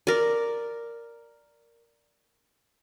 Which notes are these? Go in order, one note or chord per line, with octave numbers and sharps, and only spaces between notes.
A#4 D5